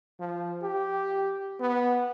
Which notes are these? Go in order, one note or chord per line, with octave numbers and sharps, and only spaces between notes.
F3
G4
B3